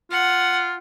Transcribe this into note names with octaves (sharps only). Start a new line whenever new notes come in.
F4 F#5